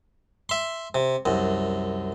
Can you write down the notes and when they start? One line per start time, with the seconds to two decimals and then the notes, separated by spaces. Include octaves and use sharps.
0.49 E5 C6
0.95 C3
1.26 C2 F#2